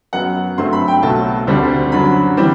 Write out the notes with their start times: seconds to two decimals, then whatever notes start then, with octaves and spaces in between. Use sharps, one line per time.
0.13 F#2 F#3 B3 F#5
0.58 G2 F#3 A3 C4 C6
0.73 B5
0.88 G5
1.02 B1 B2 F#3 A3 A5
1.47 D2 D3 G3 C4
1.92 F#2 D3 F#3 B5
2.37 E3 G3 C4